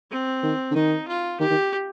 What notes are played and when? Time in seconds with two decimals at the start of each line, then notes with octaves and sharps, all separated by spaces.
0.11 C4
0.43 D#3
0.71 D3
0.75 D#3 D#4
1.08 F4
1.40 D#3 G4
1.50 D#3